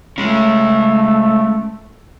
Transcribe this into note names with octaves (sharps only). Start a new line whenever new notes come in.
G#3 A3 C#4